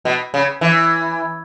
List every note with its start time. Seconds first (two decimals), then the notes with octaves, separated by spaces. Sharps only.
0.05 B2
0.34 C#3
0.61 E3